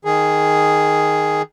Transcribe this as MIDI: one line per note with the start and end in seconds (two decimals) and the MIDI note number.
0.05 1.42 51
0.05 1.42 68